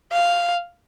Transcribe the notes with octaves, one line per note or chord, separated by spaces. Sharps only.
F5